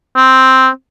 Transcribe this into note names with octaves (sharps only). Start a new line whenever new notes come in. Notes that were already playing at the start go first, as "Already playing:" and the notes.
C4